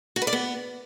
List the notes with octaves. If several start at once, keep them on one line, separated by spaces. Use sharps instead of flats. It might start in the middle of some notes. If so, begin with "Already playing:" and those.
F#4
B4
D5
B3